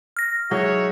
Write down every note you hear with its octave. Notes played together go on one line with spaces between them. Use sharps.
F6 A#6
F#3 G#3 D#4 F#4 C#5 E5